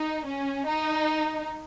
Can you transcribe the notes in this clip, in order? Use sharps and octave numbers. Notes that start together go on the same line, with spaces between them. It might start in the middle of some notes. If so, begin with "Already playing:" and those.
Already playing: D#4
C#4
D#4